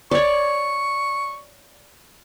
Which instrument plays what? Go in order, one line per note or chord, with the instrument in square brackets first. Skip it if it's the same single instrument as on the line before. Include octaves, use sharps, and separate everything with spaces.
[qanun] C#5 D5 [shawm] C#6